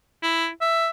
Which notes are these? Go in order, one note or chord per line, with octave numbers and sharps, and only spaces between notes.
E4
E5